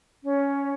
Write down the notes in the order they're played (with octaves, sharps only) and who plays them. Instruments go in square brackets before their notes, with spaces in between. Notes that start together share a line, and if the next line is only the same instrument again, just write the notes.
[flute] C#4